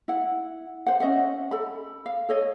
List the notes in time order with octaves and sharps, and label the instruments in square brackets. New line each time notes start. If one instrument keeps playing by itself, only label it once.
[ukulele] E4 F#5
C5 F#5
C#4 D#5 E5 F#5
A4 B5
F5
A4 C#5 D#5